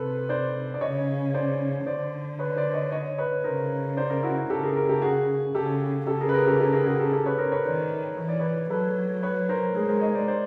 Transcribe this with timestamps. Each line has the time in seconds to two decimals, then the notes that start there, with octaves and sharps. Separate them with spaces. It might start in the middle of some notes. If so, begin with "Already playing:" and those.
Already playing: C3 A4 B4
0.29 C5 D5
0.74 D5
0.81 C#3 C#5 D#5
1.34 C5 D5
1.87 D3 C5 D5
2.39 B4 C#5
2.56 C5 D5
2.74 C#5 D#5
2.92 C#5 D#5
3.18 B4 C#5
3.44 C#3 A#4 C5
3.97 C5 D5
4.10 A#4 C5
4.23 E4 F#4
4.50 C#3 G4 A4
4.63 G#4 A#4
4.76 G#4 A#4
4.89 G4 A4
5.02 F#4 G#4
5.55 C#3 G4 A4
6.07 C#3 G4 A4
6.20 G#4 A#4
6.29 B4
6.34 G#4 A#4
6.46 G4 A4
6.60 G4 A4
6.73 G#4 A#4
6.86 F#4 G#4
6.99 G4 A4
7.12 G4 A4
7.26 B4 C#5
7.38 A#4 C5
7.52 B4 C#5
7.66 D#3 C5 D5
8.17 E3 C#5
8.28 D5
8.39 B4 C#5
8.70 F#3 A4 B4
9.23 B4 C#5
9.49 A#4 C5
9.75 G#3 G#4 A#4
9.88 A#4 C5
10.01 C#5 D#5
10.14 C5 D5
10.28 C5 D5